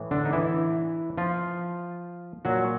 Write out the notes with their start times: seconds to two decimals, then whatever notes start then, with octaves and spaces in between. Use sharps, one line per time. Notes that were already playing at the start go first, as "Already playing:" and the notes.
Already playing: A2 E3
0.11 D3 D4
0.25 D#4
0.33 E3 E4
1.18 F3 F4
2.45 A#2 F#3 F#4